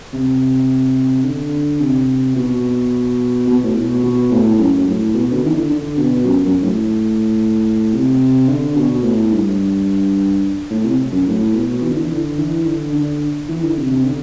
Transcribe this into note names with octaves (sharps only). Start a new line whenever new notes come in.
C3
D3
C3
B2
B2
A2
B2
B2
A2
F#2
A2
B2
D3
E3
D3
D3
B2
F#2
F#2
A2
C3
D3
B2
A2
G2
A2
C3
F#2
A2
B2
E3
D3
E3
D3
E3
D3
D3
E3
D3
C3
C3
D3